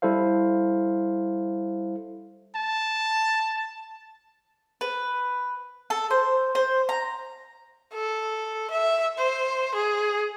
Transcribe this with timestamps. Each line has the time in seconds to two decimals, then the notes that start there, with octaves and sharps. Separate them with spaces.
0.02 G3 E4 A4 C5 F5
2.55 A5
4.81 B4
5.90 A4
6.11 C5
6.55 C5
6.89 A#5
7.94 A4
8.71 E5
9.18 C5
9.75 G#4